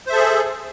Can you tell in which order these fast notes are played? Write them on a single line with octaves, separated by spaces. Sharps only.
C5 E5 A4 G#4